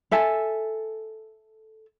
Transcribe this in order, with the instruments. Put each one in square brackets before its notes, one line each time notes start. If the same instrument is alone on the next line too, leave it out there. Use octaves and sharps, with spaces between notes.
[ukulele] A4 E5 G#5 A5